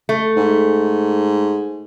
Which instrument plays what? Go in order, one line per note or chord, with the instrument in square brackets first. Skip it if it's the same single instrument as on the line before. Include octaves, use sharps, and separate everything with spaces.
[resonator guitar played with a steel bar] A3
[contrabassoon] G#2